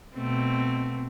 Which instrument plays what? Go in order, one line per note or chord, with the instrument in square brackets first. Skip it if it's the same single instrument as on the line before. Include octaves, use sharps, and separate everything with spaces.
[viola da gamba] B2 A3 C4